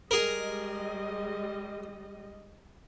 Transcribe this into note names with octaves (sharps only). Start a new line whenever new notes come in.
G3 G#3 G#4 A#4 D#5